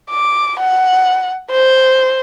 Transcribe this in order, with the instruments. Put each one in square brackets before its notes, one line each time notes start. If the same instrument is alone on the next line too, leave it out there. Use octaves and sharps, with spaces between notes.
[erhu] D6
F#5
C5